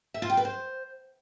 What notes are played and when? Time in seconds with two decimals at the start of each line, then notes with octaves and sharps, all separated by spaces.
0.14 E5
0.22 F4
0.30 G5
0.37 B4
0.45 C5